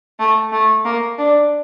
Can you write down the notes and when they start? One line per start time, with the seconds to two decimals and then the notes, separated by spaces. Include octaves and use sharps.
0.19 A3
0.52 A3
0.85 A#3
1.18 D4